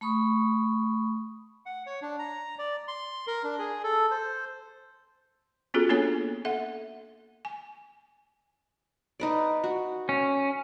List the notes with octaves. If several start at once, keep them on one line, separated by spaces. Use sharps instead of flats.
A3 B5 C#6 D#6
F#5
C#5
D4
A#5
D5
C6
A#4
D4
G#4
A4
C5
B3 C#4 F4 F#4 G#4 A4
A#3 B3 D4 A4 C#5 G#5
A4 E5 F#5
G#5
D#4 B4 D5
F#4
C#4